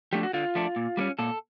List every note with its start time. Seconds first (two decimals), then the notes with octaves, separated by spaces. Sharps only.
0.13 F3 A3 D4 G4
0.23 F#4
0.33 D3 F4
0.55 F3 A3 D4
0.76 A#2
0.97 G3 A#3 C#4
1.19 A#2 A4